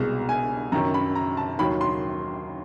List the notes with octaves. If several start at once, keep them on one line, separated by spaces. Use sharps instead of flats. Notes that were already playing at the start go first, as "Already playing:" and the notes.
Already playing: C2 B2 G#3 A#5
G#5
F#2 D#3 F#3 A#5
B5
A#5
A5
D#2 D#3 F#3 B5
C6